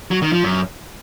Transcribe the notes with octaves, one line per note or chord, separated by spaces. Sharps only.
F#3
D#3
F3
F#2